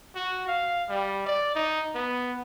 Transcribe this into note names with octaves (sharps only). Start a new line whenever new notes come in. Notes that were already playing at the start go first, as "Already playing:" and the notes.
F#4
F5
G3
D5
D#4
B3